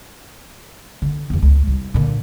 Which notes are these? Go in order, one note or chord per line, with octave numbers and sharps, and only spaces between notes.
D3
E2 B3
C#2
C2
A#2 D3